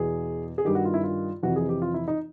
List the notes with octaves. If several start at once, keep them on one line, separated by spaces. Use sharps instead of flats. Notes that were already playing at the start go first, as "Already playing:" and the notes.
Already playing: E2 B2 G#4
G#4
G2 D#3 G4
F#4
F4
E4
F4
F2 C3 E3 F#4
G#4
G4
F4
E4
D#4